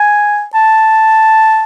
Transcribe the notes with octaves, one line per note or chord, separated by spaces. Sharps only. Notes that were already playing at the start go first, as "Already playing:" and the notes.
Already playing: G#5
A5